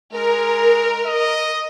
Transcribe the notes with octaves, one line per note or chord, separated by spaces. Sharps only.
G#3 A#4
D#5